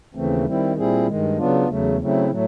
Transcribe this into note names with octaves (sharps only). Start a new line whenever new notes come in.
D#2 C#3 E3 A3 C4
D#3 G3 C4 E4
A#2 G3 C4 E4 G#4
G2 D#3 G#3
C#3 F#3 B3 D4 F4
E2 C#3 F#3 A3
C#3 F#3 A3 C4 E4
A2 F#3 A3